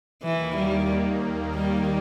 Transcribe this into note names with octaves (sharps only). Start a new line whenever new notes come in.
D#2 D#3 E3 A#3
G3
G3